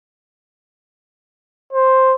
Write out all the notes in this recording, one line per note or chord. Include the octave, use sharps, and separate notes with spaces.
C5